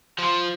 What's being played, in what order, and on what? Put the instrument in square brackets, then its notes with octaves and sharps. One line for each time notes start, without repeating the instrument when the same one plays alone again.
[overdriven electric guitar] F3